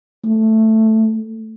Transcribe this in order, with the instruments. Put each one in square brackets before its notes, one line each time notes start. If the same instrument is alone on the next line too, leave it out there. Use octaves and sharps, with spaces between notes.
[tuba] A3